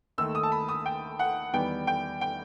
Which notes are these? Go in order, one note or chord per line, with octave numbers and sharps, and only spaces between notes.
D#2 D#3 A3 E6
D#6
A5
B5
D#6
G5
F#5
E2 D#3 G3 B3 G5
G5
G5